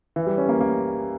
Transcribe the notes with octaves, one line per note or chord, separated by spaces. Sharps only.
E3
G3
C#4
A#3
A#3